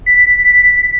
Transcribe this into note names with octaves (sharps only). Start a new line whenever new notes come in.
B6